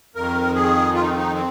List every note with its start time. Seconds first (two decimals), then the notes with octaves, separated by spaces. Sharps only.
0.15 F2 D#3 A#4
0.55 G#4
0.95 F4
1.02 D#4
1.09 C4
1.17 D#4
1.34 C4